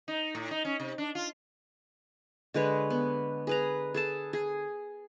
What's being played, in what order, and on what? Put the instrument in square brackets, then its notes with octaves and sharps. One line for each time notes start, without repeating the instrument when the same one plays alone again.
[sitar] D#4
A2
D#4
C#4
C3
D4
F4
[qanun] D3 G#3 B4 C#5
B3
G#4 B4 A#5
G#4 A4 A5
G#4